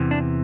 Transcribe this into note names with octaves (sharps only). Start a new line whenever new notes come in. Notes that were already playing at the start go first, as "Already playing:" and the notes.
Already playing: E2 C3 E3
D4